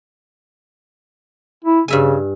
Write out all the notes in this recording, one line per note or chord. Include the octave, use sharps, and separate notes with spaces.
E4
G2 C#3 E5 G#5